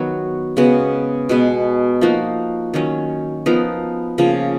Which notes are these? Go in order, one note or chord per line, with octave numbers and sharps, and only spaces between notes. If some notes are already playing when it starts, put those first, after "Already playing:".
Already playing: D#3 F#3 B3 F#4
C#3 G#3 B3 F#4
B2 G#3 B3
F3 A#3 D#4 F#4
D#3 F#3 C#4
F3 B3 D#4 A#4
C#3 F3 A#3